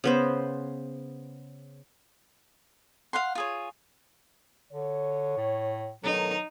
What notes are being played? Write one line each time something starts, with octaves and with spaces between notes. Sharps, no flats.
C#3 B3 C5
F5 F#5 C6
F4 G#4 C#5
D3 C#5
A2
D#3 F#3 B3 D#4 A4